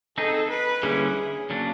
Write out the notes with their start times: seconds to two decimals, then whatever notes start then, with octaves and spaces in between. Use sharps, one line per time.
0.17 C4 D#4 G#4 A4
0.50 B4
0.83 D3 G3 A#3 C#4 E4 G#4
1.50 C#3 F#3 A#3 D4